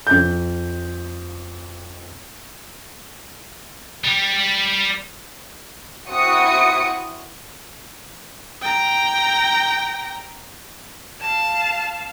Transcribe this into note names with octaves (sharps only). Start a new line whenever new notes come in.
F2 G6
G3
C4 E4 F#4 D#6 C#7
G5 A#5
F5 A5